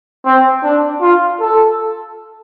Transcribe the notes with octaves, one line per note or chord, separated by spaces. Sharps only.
C4
D4
F4
A4